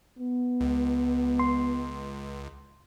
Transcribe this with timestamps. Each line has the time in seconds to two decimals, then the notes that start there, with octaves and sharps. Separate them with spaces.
0.18 B3
0.60 C#2
1.39 C6